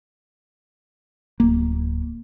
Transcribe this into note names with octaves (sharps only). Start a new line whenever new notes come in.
D1 A#3